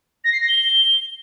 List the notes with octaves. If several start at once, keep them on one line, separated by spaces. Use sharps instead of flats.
A#6
C7
A#6
G7